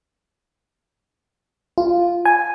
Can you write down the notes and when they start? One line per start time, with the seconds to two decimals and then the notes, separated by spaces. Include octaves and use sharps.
1.78 F4
2.26 G#5